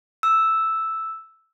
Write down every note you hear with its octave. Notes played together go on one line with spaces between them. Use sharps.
E6